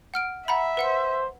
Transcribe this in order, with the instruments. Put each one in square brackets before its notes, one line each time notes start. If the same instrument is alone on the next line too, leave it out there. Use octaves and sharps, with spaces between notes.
[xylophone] F#5 F6 D7
[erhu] E5 [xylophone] F#5 A#5 B5
[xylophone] B4 F#5 C#7 [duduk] C5